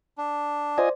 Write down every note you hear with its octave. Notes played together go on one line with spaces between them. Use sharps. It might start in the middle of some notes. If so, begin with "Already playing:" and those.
D4
F4 C5 D5 D#5 G#5